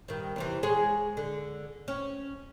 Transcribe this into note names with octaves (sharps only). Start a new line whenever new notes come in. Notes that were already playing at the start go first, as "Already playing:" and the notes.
G2 D#3
E2 C3 E3
G#3 G#4 C#5
D3
C#4